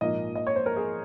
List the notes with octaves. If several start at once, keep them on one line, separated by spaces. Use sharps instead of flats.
A#1 G#2 F3 A#3 D#5
D#5
C#5
C5
A#4
G#4